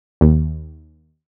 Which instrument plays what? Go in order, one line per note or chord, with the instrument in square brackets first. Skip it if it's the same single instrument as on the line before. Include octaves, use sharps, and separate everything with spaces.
[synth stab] D#2